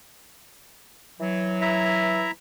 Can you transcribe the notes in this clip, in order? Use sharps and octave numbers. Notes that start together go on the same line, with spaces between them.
E3 F#3
E4 E5 A#5